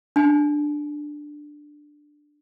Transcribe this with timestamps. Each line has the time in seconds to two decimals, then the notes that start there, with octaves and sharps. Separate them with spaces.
0.16 D4 G#5